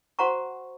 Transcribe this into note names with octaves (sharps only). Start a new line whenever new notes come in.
F#4 C5 F#5 A#5 C#6